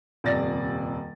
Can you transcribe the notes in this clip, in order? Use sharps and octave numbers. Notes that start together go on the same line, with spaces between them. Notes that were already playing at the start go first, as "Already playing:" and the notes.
D#1 F2 C3 D5 A6 A#6